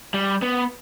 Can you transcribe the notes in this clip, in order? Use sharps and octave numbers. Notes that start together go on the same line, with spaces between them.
G3
B3